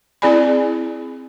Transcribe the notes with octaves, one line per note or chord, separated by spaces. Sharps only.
C4 E4 G#4 D5 G#5 B5